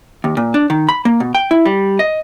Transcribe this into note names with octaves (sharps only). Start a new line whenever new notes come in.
D#2
A#2
D4
D#3
B5
A#3
B2
G5
E4
G3
D#5